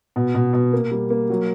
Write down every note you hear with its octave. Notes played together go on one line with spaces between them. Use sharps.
B2
B2
B2
A#3
G3
A#3
F#3